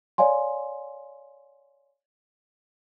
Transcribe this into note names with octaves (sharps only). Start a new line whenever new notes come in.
C#5 D5 F5 G#5 C6